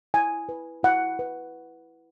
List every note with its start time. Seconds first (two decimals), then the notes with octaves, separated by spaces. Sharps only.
0.14 E4 G#5
0.49 B4
0.83 E4 F#5
1.19 B4